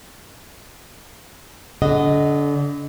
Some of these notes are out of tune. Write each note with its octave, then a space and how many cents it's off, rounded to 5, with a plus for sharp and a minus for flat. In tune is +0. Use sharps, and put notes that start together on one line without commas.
D3 -30 D#5 -5 F#5 +0